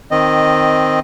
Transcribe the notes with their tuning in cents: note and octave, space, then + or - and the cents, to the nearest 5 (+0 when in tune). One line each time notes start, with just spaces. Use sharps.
D#3 +0 C4 +0 D#5 -10